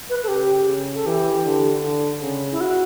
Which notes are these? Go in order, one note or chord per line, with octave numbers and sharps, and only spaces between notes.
B4
A4
C#3 G4
C#3
A4
E3 G4
D3
D3
C#3
E4
F#4